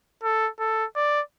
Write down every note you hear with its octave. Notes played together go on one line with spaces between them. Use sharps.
A4
A4
D5